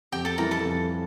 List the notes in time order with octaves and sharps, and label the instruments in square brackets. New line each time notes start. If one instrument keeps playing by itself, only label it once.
[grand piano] F2 [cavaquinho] G4 G5
[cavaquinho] A4 A5
[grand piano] E3 G3 [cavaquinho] A#4 A#5
[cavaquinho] A4 A5
[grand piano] F2